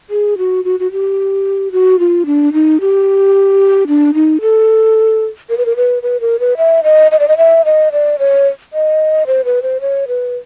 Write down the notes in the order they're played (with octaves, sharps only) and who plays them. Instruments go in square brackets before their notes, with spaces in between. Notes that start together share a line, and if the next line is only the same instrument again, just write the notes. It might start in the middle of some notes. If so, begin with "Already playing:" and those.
[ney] G#4
F#4
F#4
F#4
G4
F#4
F4
D4
D#4
G4
D4
D#4
A4
A#4
B4
A#4
B4
B4
A#4
B4
E5
D#5
D#5
D5
D#5
E5
D#5
D5
C#5
D#5
C5
B4
C5
C#5
B4